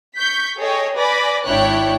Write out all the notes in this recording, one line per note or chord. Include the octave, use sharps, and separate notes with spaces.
C#6 G6 B6
G#4 A4 C#5 D#5 G5
B4 D5 G#5 B5 A#6
G#1 D4 E4 C#5 G5 F#6